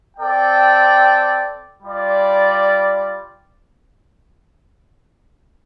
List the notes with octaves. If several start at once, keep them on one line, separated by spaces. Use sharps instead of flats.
C4 A4 D5 G5
G3 F4 D5